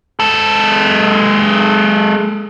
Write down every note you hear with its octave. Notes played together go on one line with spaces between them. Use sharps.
G#3 A4